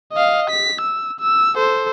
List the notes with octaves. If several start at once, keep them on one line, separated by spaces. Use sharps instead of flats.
D#5 F5
B6
E6
E6
A4 C5